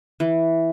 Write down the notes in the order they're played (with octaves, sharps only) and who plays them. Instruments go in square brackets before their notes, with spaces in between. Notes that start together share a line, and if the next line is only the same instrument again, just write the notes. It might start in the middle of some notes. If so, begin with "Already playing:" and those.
[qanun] E3